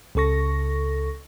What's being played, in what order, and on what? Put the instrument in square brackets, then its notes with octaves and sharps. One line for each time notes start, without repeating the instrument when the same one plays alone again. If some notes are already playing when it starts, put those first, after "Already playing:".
[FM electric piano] C#2 C#3 A4 C#6 A#6